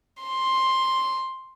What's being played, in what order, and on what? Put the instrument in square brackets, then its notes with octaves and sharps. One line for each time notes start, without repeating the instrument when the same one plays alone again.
[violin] C6